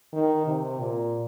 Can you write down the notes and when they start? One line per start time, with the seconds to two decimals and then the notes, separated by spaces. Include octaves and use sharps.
0.13 D#3
0.47 C3
0.80 A#2